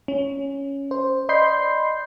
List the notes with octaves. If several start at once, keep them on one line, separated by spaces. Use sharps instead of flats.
C#4
C5
D5 D#5 B5 C6 G6 C7